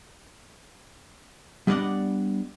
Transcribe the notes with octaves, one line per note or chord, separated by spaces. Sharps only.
G3 B3 D4 D5 D#5 F#5